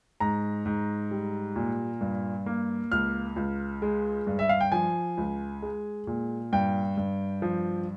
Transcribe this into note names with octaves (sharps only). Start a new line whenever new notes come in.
G#2 A#5
G#2
G3
A#2
G2
A#3
C#2 F6
C#2
G#3
G2
E5
F5
G5
F3 G#5
C#2
G#3
A#2
G2 G5
G2
F3